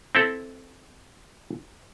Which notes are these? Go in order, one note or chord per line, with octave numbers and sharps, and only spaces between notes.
C4 E4 A4